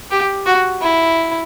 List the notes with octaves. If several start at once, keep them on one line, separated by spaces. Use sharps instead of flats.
G4
F#4
E4